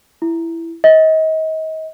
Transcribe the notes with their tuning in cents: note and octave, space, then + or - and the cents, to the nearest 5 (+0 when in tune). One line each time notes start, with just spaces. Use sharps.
E4 +10
D#5 +35